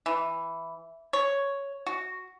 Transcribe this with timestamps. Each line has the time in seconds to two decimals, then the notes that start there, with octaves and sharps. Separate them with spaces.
0.06 E3
1.13 C#5
1.87 F#4